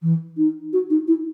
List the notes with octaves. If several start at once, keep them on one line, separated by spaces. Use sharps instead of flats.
E3
D#4
F#4
D#4
E4